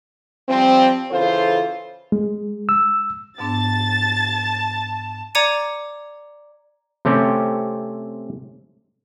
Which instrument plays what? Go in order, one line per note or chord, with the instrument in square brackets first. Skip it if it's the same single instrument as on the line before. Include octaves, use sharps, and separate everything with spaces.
[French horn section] F3 G3 C4
C#3 E3 F4 A4 C5
[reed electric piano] G#3
E6
[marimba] G#2 B3 D4 [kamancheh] A5 [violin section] A6
[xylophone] D5 A#5 D6 G#6 C#7 D#7
[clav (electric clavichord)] C3 A3 C4 C#4 G4